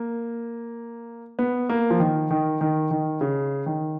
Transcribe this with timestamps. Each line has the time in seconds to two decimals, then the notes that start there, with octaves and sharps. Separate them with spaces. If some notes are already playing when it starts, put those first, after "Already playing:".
Already playing: A#3
1.39 B3
1.69 A#3
1.90 F3
1.99 D#3
2.31 D#3
2.61 D#3
2.91 D#3
3.21 C#3
3.66 D#3